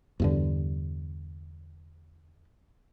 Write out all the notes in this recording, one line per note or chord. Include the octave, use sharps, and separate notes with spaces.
E2 G2 D3